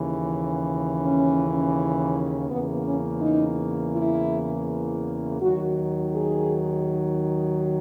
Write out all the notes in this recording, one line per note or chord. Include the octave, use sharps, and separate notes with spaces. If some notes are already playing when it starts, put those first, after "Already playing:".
Already playing: D#2 C#3 E3
C#4
E2 C#3 E3 A#3 B3
C#4
D#4
E4
D#2 D#3 F#3 F#4
G#4